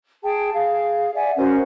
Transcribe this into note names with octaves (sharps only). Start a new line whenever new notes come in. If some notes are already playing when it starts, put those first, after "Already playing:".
G#4 G5 A5
G#4 F5
D5 E5 F#5 G#5
C#4 F#4 A#4 C5